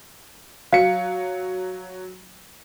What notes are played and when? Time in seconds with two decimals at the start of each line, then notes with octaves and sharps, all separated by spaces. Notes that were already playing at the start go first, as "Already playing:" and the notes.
0.73 F#3 F5 C#7